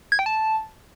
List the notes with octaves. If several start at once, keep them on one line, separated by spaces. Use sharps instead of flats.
G#6
G5
A5